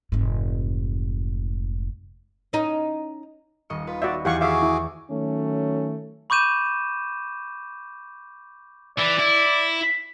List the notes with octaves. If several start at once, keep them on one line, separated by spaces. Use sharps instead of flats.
F1 G#2
C#4 D#4
D#1 D#5 C#6
F4 B4
F#4 D5 E5
E2 G4 F5 F#5 G#5 C#6
F#4 G#4 E5 F5 C#6 D6
E4
D#3 F#3 A3 C#4
B5 C#6 D6 G6 D#7 E7
E3 D5
E4